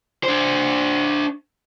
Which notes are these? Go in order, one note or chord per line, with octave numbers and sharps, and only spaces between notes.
D4 C5